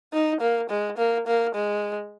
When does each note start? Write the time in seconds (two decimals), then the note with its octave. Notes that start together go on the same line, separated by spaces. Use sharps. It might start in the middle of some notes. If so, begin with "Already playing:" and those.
0.13 D#4
0.41 A#3
0.70 G#3
0.98 A#3
1.27 A#3
1.55 G#3